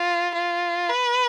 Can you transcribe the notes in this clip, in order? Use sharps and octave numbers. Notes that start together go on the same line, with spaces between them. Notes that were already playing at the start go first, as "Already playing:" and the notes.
Already playing: F4
F4
B4